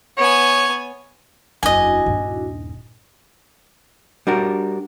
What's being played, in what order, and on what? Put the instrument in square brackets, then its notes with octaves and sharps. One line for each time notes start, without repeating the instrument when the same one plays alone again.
[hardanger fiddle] B3 G#5 [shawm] C#5
[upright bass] F#1 E2 [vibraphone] D4 E4 F#4 [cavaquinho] D#5 G#5
[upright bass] D#1 G2
[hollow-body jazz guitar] G3 D4 F#4 A#4